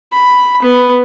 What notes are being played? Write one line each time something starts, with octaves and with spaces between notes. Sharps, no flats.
B5
B3